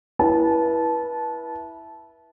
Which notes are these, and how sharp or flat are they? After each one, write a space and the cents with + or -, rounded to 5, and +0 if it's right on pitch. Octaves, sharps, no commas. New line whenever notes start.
E4 +0 B4 -30 A5 -20